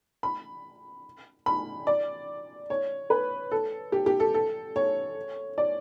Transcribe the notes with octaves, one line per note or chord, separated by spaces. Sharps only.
B5
B5
D5
C#5
B4
A4
G4
G4
A4
A4
C#5
D5